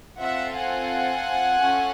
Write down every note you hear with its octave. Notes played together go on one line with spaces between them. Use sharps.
C4 F4 A4 E5 F#5
F#5 G#5
C#4 F4 A4